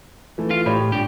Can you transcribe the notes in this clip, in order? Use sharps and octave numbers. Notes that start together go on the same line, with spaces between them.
E3 A3
F4
A2 G4 C#5 B5
G#2 D4 G4